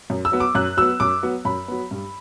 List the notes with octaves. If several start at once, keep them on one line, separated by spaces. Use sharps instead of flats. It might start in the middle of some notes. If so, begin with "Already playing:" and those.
F#2
E6
F#3 B3
D6
F#2 F#6
F#3 B3 E6
F#2 D6
F#3 B3
F#2 B5
F#3 B3
G2